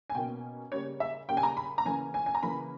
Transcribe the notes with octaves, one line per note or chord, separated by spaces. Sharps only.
G#5
B2 A#3 C#4 G5
C#3 G3 A#3 C#5
E5
C#3 G3 A#3 G5
G#5
A#5
B5
A#5
C#3 E3 A#3 C#4 G#5
G#5
G#5
A#5
C#3 E3 A#3 C#4 B5